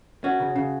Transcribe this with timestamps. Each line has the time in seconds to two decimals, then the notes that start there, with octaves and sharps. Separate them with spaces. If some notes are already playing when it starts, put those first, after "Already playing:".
0.24 C#4 F#4
0.40 C#3
0.56 C#3